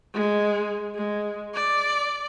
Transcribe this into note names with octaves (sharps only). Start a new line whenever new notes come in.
G#3
G#3
D5